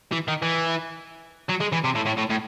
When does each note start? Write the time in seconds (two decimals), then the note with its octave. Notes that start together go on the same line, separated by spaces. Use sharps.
0.12 E3
0.28 D#3
0.42 E3
1.49 F#3
1.60 G#3
1.72 E3
1.84 C3
1.95 A2
2.06 A2
2.17 A2
2.30 A2